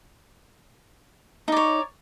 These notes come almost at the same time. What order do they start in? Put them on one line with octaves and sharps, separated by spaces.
D#4 D5 C#5